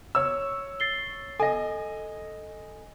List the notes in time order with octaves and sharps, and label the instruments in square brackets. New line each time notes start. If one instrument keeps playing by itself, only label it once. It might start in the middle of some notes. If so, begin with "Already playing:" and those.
[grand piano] C#5 E6
[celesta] A6 C7 G7
[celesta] A4 [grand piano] D#5 G#5